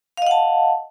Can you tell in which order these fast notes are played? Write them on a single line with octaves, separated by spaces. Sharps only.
F5 D#5 F#5 A5